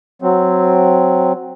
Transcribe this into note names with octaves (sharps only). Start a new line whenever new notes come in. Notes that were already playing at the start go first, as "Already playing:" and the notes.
F#3 C4